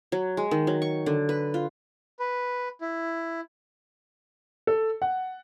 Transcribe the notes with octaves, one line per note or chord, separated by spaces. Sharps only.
F#3
G#3
D#3
F#3
C#6
D3
B4
F4
B4
E4
A4
F#5